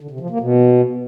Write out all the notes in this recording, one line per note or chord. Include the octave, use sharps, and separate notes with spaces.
D3
C3
F3
A#3
B2